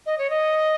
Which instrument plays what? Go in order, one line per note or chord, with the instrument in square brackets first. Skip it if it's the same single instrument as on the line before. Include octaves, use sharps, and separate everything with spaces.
[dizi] D#5
C#5
D#5